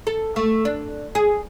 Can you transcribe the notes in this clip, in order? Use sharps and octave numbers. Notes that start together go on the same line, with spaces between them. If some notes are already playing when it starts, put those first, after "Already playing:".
A4
A3
D4
G#4